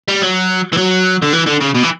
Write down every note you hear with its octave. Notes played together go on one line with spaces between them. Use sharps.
G3
F#3
E3
F#3
D3
E3
D3
C#3
B2
E3